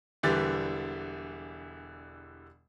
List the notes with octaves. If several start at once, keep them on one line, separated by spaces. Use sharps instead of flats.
E1 D3 E3 G3 G4 A6